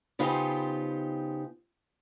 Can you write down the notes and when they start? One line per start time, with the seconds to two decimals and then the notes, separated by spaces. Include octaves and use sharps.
0.19 C#3 B3 D#4 F4 G4 C5